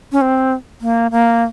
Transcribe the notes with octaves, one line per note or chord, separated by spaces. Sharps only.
C#4
C4
A#3
A#3